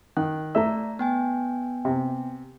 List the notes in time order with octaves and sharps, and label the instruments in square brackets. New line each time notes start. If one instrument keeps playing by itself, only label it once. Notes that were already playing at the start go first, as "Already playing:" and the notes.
[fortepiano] D#3 [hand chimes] F#6
[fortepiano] A3 E5 [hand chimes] D5 A#5
[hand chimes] B3 G5 G#5
[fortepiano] C3